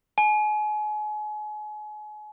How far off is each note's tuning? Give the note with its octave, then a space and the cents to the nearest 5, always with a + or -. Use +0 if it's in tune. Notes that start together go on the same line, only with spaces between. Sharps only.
G#5 +35